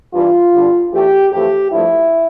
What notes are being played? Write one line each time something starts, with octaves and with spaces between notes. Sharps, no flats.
G2 E3 G3 F4
G2 D3 G3
E2 E3 A3 G4
F2 E3 A3 G4
G2 F3 A3 E4